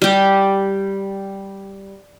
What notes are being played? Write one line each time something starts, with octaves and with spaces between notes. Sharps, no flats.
G3 G4